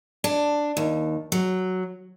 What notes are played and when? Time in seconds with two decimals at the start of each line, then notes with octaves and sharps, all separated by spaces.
0.24 D4
0.77 D#2
1.32 F#3